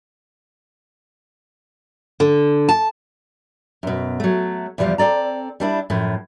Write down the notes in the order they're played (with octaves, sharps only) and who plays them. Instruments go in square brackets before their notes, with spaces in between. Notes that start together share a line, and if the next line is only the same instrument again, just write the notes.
[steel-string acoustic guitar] D3
A5
F#2 B2
F#3 A3
E2 C3 F3 G3 F5
C4 A4 D5 A#5
G3 D4 E4
F#2 A2 F3